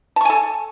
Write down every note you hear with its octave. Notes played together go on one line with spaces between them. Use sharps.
A4 G#5 A5 C#6